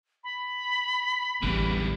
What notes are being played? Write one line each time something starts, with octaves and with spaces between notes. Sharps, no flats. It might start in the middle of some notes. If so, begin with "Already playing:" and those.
B5
A1 E2 D3 E3 G3